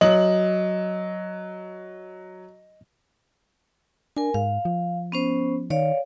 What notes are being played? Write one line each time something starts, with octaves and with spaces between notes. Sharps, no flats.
F#3 D#5 F#7
D4 A#4 G#5
G#2 F5
F3
B3 C#4 C5
D#3 C#5 D5 F5